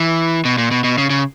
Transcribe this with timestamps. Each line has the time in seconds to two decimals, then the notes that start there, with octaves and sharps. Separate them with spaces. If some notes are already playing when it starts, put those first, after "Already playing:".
Already playing: E3
0.45 B2
0.58 A#2
0.71 B2
0.84 B2
0.98 C#3
1.10 C#3